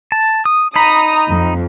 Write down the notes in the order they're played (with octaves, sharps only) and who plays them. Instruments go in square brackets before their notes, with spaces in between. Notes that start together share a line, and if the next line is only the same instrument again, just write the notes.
[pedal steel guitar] A5
D#6
[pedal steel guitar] D#4 B5 [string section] A#5 D#6
[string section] F2